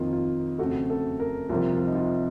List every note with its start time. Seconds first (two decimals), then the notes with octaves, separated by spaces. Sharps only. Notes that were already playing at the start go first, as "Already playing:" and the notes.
Already playing: F2 D#3 A#3 F4
0.13 F4
0.58 F2 C#3 A3 F#4
0.90 A4
1.20 A#4
1.49 C2 C3 F3 A#3 F4
1.73 F4
1.87 D#4
1.95 F4